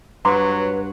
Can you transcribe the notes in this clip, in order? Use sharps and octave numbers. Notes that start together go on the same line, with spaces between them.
G2 F#3 B4 A#5 C6 D6